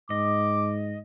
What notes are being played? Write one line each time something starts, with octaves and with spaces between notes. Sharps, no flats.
G#2 D#5 D6